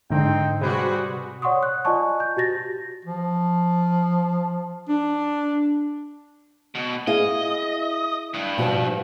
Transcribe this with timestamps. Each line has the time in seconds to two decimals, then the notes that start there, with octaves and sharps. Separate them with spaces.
0.10 G#2 D3 C4 D#4 G5
0.61 C3 G3 F#4 G#4 B4 C5
1.42 C#5 D5 F#5 C6 C#6 D#6
1.63 F#6
1.85 F4 D5 D#5 G#5 A5 C#6
2.20 G6
2.37 F#4 G4 A6 A#6
3.05 F3
4.89 D4
6.75 B2
7.07 E4 G#4 D#5 F5
8.34 G2
8.58 B2 F3 G3